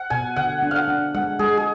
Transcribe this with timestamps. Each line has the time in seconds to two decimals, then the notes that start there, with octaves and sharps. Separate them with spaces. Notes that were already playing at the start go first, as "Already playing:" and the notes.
Already playing: F#5
0.10 B2 G#5
0.36 D3 F#5
0.63 D4
0.71 F5 F#5
0.88 D4
1.15 G#3 F#5
1.39 G#3 G#4
1.57 G#4